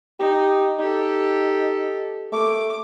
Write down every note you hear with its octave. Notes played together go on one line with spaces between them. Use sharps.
D#4 G4
D#4 G4 A4
A3 D6